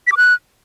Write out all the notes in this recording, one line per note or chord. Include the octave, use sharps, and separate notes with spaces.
B6
D6
F#6